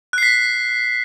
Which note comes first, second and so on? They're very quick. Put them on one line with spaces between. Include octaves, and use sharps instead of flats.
F#6 C7 B6